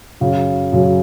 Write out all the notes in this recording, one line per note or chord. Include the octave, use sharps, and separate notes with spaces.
F#2 C#3 F#3
F#2 C#3 F#3